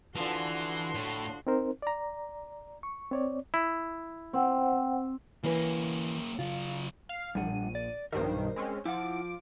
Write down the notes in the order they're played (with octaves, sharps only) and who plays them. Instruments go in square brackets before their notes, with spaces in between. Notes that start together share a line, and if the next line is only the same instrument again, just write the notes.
[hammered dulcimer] D3 F3 A4 [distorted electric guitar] E3 [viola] F#4 C6
[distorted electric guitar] A2
[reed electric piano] C4 D#4 A#4 C5
D5 A#5
C#6
C4 C#5 D5
[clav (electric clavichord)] E4
[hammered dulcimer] C4 [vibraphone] C5 F#5 G5
[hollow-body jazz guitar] E3 B4 [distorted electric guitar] A#3 C#4
[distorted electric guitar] C#3 F#3 [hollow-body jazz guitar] F4
[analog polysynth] F5
[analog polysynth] A#1 D#7 [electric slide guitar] G3 D4 F#5
[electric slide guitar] D5
[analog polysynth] B1 G2 D#3 [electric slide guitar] A#4 C5
[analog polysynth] G#3 C4 C#4
[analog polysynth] F3 D6 [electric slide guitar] E4 F#5